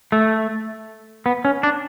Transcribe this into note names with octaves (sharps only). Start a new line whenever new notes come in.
A3
B3
C#4
D4